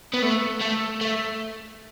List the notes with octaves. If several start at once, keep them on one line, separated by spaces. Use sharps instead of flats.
B3
A3
A3
A3